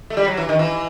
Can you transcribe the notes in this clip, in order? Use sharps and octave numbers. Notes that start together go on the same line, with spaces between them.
A3
G3
F#3
E3
D#3
E3